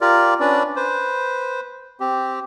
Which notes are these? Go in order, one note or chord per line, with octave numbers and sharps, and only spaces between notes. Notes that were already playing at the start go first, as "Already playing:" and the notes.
F4 G4 A#4 D5
C#4 D4 B4 D5
B4 C5
C4 G4